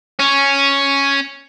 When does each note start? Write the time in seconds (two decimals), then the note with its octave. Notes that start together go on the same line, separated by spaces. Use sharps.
0.20 C#4